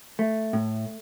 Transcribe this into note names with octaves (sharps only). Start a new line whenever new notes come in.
A3
A2